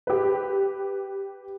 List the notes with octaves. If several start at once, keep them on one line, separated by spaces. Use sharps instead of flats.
G4 B4